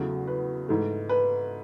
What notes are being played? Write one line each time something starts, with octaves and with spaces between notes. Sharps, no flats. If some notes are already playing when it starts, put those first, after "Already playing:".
Already playing: E2 C#3 F#3 A3
B4
G#2 E3 A3
B4